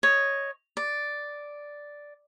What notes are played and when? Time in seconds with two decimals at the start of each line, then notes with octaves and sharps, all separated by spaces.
0.03 C#5 D#5
0.77 D5